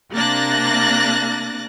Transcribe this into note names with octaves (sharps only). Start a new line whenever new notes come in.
C3 A#3 D4 F#6 A6 A#6